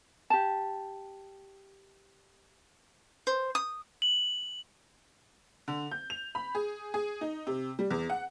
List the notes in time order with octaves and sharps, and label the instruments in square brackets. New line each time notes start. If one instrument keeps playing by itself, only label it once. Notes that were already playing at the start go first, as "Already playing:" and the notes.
[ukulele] G4 A5
[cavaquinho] C5
D#6
[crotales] F#7
[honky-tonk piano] D3
G6
F7
B5
G#4
G#4
D#4
C3
G3
E2
F#5